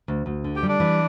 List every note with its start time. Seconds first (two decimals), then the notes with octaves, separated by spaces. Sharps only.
0.08 D2
0.26 D2
0.44 D3
0.56 G4 G5
0.63 G3
0.69 D4 D5
0.80 E3